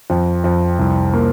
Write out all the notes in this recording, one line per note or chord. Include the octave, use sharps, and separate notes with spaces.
F2
F2
C2
A#3